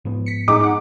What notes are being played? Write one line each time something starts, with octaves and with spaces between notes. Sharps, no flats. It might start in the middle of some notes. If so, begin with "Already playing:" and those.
G#2 F3 B3
B6 C#7
A2 G#3 D#4 D6
D#4 F#5